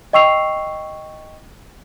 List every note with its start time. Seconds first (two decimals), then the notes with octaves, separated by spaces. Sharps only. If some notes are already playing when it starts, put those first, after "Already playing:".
0.13 D#5 G5 C#6 E6 C7 F7